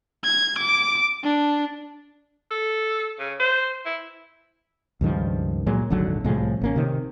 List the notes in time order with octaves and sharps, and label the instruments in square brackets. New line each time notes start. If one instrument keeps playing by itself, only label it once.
[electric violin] G#6
D6
D4
[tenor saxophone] A4
C#3
C5
E4
[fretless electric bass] C#2 G2 D#3 F3
A#2 F#3 G#3
D#1 G#1 D3 F#3
C2 A2 F3 G#3
G#1 A#3 C#4
C3 D#3